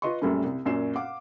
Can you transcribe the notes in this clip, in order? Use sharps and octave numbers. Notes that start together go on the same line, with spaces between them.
F4 B4 D#5 C6 C#6
F#2 A#2 G3 A3 C#4
C2
F#2 A#2 C#4 D5 C7 E7
F5 F#5 D6